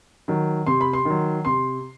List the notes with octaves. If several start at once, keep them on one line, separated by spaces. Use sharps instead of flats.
D#3 F#3
C3 C6
B5
C6
D#3 F#3
C3 C6